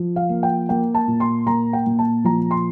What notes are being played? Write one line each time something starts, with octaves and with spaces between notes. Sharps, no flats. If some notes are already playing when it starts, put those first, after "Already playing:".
Already playing: F3
F5
A#3
G5
A#3 G5
A5
A#2
C6
A#3 A#5
G5
A#2
A5
F3 A#5
C6